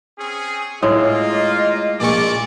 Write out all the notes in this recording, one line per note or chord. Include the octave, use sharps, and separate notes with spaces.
C4 C#4 G#4
A2 G#3 A#3 F4 D#5
A#1 A#2 D5 A5 C#6 D6